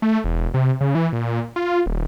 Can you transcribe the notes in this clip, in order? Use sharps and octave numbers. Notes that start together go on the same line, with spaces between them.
A3
E1
C3
C#3
E3
A#2
F4
D#1